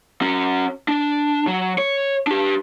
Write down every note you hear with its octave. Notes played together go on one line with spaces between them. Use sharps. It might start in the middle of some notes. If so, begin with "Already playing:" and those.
C#4 F#4
D4
F#3
C#5
D4 G4